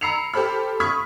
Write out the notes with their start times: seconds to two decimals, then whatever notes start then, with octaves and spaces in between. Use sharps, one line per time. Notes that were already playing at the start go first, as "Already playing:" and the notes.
0.01 A#5 B5 E6 C7 C#7 F7
0.34 G4 A4 C5 B5 F6
0.80 B5 C#6 D#6 F6 G#6 B6